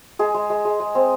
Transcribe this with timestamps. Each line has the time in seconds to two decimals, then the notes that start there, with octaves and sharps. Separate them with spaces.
0.19 G#3 G#4
0.34 G#3
0.50 G#3
0.65 G#3
0.80 G#3
0.95 C4